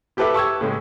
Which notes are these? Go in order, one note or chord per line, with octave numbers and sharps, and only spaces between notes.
E4 G4 A4 B4 E5 D6
A5 C#6 E6 G#6
A2 C#3 G#3